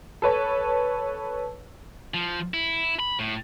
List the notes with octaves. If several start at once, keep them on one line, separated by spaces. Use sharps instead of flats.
A4 B4 C#5
F3
E4
B5
A2